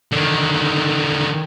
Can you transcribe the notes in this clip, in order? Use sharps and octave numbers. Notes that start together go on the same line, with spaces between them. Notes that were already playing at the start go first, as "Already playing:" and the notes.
D3 D#3